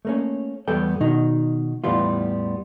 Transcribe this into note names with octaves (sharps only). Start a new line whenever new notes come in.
A3 A#3 C#4
E2 G3 B3 A4 G5
B2 D#3 D#4
E2 A2 E3 G3 B3 F4